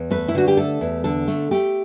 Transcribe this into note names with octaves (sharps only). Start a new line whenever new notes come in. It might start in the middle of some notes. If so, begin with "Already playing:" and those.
Already playing: E2
A3 B4
E4
D3 F#4
G4
A3 A4
E2
D3 A4
A3
A3 G4